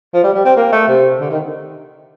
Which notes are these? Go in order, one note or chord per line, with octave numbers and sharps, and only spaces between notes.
F3
G3
G3
C4
A#3
A3
C3
D3
D#3